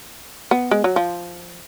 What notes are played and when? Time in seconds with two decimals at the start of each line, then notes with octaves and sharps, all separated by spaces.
0.51 B3
0.71 G#3
0.84 F#3
0.96 F3